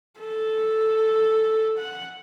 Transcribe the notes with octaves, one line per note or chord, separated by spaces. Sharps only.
A4
F#5